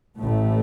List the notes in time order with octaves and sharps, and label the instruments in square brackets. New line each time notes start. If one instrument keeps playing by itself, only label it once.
[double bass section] A1 A2 A3